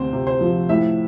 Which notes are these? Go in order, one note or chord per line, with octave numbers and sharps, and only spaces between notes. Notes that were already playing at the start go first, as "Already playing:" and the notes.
Already playing: D2 C3 C4 C5
C3
C5
F3
A2 E5